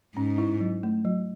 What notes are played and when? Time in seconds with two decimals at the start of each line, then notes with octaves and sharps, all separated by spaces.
0.16 G#2 C#4
0.38 E4
0.60 F#3
0.83 A3
1.05 F#3